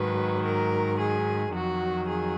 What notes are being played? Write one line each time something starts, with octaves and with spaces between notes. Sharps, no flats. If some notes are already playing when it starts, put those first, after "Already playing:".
Already playing: G#2 D#3 F#3 B4
A#4
G#4
F2 D#3 F#3 F#4
G#4